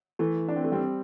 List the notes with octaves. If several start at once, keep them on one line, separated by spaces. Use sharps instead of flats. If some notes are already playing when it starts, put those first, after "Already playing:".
E3 A3
D4
C4
A3
G3 C4